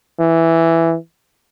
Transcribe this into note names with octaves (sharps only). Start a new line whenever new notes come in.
E3